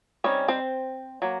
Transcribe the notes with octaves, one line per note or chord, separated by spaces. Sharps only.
G3 C4 C#4 D#4 C#5
C4 C5
F#3 A#3